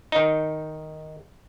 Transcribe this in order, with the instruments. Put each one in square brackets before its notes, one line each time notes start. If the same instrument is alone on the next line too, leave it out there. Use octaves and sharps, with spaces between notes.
[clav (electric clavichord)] D#3 D#4